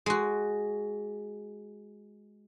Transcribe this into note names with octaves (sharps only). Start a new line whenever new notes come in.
G#3 F#4